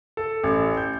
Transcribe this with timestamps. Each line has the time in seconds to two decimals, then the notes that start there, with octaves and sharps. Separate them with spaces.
0.17 A4
0.44 A1
0.77 G6